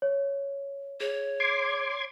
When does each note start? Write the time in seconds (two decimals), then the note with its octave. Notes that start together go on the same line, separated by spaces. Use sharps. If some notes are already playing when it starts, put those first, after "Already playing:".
0.02 C#5
1.00 G#4 C#5
1.40 C6 D6 G#6